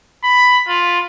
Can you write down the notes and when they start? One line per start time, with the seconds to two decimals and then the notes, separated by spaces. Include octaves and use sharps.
0.24 B5
0.68 F4